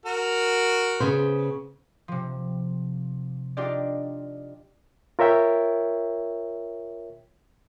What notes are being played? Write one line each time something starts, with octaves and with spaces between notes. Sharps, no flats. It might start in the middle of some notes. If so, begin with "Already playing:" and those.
F#4 A#4
C#3 B3 C5
C3 F3
D4 D#4 F4 G4 D5
F4 A#4 C#5 E5 G5